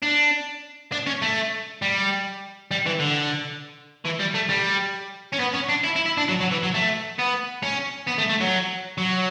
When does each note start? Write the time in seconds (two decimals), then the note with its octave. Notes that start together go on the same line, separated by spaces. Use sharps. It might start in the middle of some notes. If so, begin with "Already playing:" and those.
0.02 D4
0.92 D4
1.07 C#4
1.22 A3
1.82 G3
2.71 G3
2.86 E3
3.00 D3
4.05 E3
4.20 G3
4.35 A3
4.50 G3
5.32 C#4
5.39 B3
5.54 C#4
5.69 D4
5.83 E4
5.96 E4
6.06 E4
6.17 D4
6.29 F#3
6.41 F#3
6.51 E3
6.63 F#3
6.74 A3
7.19 B3
7.63 C#4
8.08 B3
8.19 A3
8.30 A3
8.41 F#3
8.98 F#3